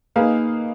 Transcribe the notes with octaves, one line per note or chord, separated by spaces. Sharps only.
A#3 D#4 G#4 B4 F5